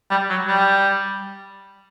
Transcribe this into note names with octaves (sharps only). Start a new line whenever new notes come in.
G3
F#3
G3